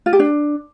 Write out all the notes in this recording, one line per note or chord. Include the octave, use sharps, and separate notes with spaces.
F4
G4
D4